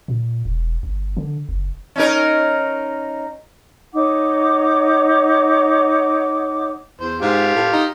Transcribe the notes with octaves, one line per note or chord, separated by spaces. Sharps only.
A#2
E1
G1
D3
F#1
C#4 D#4 A#4
D#4 C#5 F#5 D6
E2 C5
G#2 F4 G4
A2
D#4